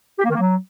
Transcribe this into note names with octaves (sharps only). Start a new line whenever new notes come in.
G4
A#3
D#3
A#3
F#3